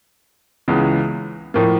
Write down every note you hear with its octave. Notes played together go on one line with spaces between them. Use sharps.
C#2 C#3 E3 G#3 B3
A2 F3 A#3